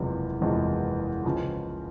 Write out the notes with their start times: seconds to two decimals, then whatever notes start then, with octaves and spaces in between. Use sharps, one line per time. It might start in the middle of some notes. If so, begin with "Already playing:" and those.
Already playing: F#1 E2 C3 F3 G#3
0.41 F#1 E2 C3 F3 G#3
1.24 C#2 C#3 F3